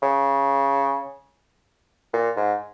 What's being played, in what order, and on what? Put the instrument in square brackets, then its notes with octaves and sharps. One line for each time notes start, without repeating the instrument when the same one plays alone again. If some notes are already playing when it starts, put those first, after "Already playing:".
[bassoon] C#3
A#2
G#2